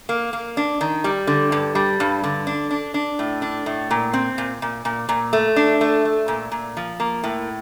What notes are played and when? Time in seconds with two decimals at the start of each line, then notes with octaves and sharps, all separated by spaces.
0.09 A#3
0.33 A#3
0.57 D4
0.81 D#3
1.04 G3
1.27 D3
1.52 G2
1.75 G3
2.00 G2
2.24 D3
2.47 D4
2.71 D4
2.94 D4
3.19 A2
3.42 D4
3.66 A2
3.91 A#2
4.13 C4
4.38 A#2
4.62 A#2
4.85 A#2
5.09 A#2
5.33 A3
5.56 D4
5.81 A3
6.05 A3
6.28 A#2
6.52 A#2
6.77 F3
7.00 A#3
7.23 A2